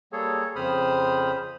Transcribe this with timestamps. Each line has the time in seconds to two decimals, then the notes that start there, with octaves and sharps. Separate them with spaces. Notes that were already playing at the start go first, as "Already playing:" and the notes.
0.12 G3 A#3 G#4 A4 C#5
0.56 F2 C#3 C5 B5 D#6 F6